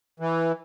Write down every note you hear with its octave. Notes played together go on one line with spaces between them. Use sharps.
E3